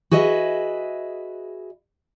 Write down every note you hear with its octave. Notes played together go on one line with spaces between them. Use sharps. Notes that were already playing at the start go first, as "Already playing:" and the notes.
F#4 G#4 B4 D#5 E5